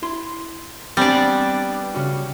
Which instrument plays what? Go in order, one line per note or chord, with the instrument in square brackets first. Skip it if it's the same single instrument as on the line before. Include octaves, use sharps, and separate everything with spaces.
[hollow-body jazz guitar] E4 C6
[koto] G3 D4 [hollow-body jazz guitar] B3 C4 G#5
[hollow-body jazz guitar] C#3 C#4 F#4